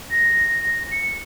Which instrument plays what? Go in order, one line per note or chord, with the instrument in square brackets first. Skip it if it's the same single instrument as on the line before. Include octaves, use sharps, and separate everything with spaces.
[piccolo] A#6
C#7